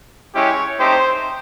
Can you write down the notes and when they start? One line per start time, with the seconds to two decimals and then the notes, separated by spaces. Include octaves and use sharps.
0.35 G#3 C#4 E4 G4 C#5
0.79 A3 C4 D#4 G4 C5